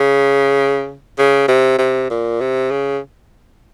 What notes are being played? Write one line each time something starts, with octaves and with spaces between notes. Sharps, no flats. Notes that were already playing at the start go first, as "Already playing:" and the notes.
Already playing: C#3
C#3
C3
C3
A#2
C3
C#3